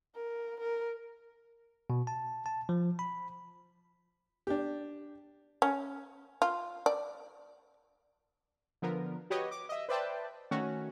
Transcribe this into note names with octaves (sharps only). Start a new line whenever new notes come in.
A#4
A#4
B2
A5
A5
F3
B5
D4 G4
C#4
F4
D5
D3 F3 B3 A#4
F#4 G4 B4 C#5 D#5
D6
D#5 E5
B4 C5 D5 E5 G5 A5
D#3 A3 C#4 F#4